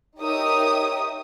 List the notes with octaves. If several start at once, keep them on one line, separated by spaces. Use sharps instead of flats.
D#4 G4 A#4 C#5 E5 D#6